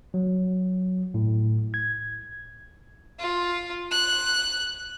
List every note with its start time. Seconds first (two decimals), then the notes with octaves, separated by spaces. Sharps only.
0.14 F#3
1.14 A2
1.74 G#6
3.19 F4
3.91 F#6